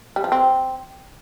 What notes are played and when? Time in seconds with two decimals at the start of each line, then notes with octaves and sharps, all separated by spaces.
0.16 G3
0.24 F3
0.32 C4